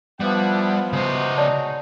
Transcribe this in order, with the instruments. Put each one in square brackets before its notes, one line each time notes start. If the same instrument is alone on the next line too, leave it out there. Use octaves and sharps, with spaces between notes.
[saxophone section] F3 B3 [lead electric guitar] G3 [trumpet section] D4 E4 F#5
[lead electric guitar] C#3 C5 [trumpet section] G#3 D#4 F#4
[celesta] C#5 D5 A5